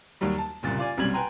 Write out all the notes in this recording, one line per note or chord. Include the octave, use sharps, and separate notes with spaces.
D#2 D#3 F#3 G3
A5
F#1 C2 A#2 A6
F4 D5 G#5
B1 F#2 C3 G3 G#6 F#7
B4 G5 G#5 A#5 C6